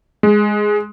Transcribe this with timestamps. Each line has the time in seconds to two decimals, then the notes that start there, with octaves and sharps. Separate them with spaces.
0.23 G#3